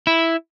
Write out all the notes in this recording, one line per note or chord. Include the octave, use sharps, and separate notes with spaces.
E4